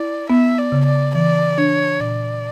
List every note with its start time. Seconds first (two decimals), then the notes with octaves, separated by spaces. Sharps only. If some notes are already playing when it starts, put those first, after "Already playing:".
Already playing: E4 D5
0.30 B3 E5
0.58 D5
0.72 C#3
0.86 D5
1.15 E3 D5
1.58 D4 C#5
2.00 A#2 D5